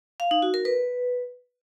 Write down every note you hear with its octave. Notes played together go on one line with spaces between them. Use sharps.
F5
D#4
F#4
A#4
B4